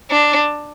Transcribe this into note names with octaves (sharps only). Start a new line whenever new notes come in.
D4